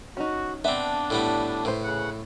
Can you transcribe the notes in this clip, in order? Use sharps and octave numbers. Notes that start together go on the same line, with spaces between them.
C#4 D#4 F#4
B3 C4 D4 E5
A2 G3 B3
A2 B4 C5
C#3 F#5